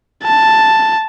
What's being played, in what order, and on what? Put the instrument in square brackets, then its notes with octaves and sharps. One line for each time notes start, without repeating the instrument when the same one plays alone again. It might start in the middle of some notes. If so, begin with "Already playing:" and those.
[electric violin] A5